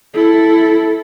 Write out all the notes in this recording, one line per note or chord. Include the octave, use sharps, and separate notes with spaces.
E4 A4